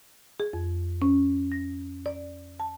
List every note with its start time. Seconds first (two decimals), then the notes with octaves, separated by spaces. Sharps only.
0.40 G#4
0.53 F2
1.02 C#4
1.52 A#6
2.06 D5
2.60 A5